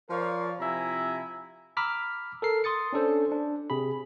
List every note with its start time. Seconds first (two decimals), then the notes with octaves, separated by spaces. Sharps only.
0.10 F3 A#4 C#5 D5 F5
0.60 C3 F3 E4 G#5 A#5
1.77 A#5 B5 D6 E6 F6 B6
2.42 A4 A#4 C7
2.64 C6 D#6 A6 C#7
2.93 C#4 D4 A4 C5
3.32 D4
3.70 C3 G#4 B5